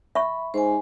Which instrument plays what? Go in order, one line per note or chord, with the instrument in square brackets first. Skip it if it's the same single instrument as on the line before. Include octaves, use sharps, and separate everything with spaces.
[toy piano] E5 C#6 [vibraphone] B5
[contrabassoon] G#2 [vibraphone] C5 G#5